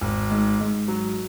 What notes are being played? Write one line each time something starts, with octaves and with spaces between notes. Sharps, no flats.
G#1
G#2
G#2
F#3